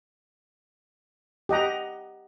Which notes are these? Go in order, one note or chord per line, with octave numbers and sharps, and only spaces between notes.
G4 D#5 F#5 A#5